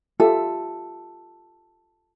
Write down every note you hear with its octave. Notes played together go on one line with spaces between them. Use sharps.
F4 G4 A4 E5